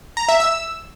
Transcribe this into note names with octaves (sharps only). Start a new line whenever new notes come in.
A#5
E5
E6